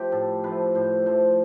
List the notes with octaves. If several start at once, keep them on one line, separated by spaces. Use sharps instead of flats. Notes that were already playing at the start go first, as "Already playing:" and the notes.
Already playing: F3 A3 G4 C5
A2 A4
F3 A3 B4
A2 C5
F3 A3 C5